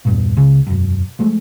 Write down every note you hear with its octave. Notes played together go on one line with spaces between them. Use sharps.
E2 G2 A#2
C#2 C#3
E1 F#2
F3 G#3 A3